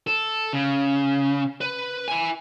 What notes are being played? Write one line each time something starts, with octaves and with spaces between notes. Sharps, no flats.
A4
C#3
B4
E4 G#5